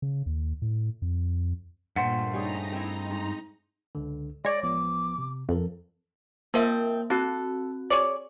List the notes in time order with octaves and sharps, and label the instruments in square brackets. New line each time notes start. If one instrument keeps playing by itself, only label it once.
[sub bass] C#3
D#2
A2
F2
[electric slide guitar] G2 A3 C5 [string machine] A#2 [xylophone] F#5
[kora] G3 C#4 G#4 [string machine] D#4 A#5
[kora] C4 E4
G#2
[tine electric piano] C#2 D3
[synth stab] G#3 C#5 [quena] D5 [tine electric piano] A#6
[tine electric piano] A1 F3 B3 [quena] D6
[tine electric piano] C3
[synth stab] F2 [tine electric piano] C4 A4 A#4
[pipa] F3 C4 [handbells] A#3 A#4 E5
[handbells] C4 F#4 F#6 [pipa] A4
[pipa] G#4 C#5 D5